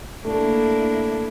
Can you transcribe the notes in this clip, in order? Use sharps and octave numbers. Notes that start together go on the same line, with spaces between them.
A3 A#3 D4 E4